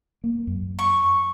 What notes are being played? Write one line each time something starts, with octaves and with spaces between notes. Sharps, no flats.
A#3
F#2
C#6